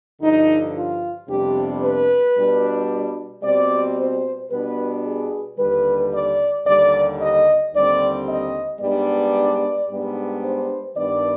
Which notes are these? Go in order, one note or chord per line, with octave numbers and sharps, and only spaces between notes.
G2 D3 F3 D#4
F4
F2 C3 G3 B3 D4 G4
B4
B2 G3 D4
B2 G3 C4 D5
C5
B2 G3 B3 D4 B4
G#4
D#2 D3 G3 B4
D5
D#2 D3 G3 D5
D#5
D#2 D3 G3 C4 D5
D#5
G#2 G3 B3 D4 D5
G#2 G3 B3 D4
C5
G2 D#3 B3 D4 D5